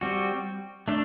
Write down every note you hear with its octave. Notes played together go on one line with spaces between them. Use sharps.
G3 C4 F#4
A3 D4 A4